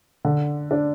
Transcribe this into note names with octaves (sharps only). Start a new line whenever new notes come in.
D3
D4